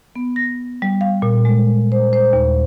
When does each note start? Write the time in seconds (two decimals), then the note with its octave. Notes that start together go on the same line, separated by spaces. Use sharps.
0.16 B3
0.36 A#6
0.82 G3
1.01 F5
1.22 A#2
1.45 G#3
1.92 C5
2.13 C5
2.33 D#2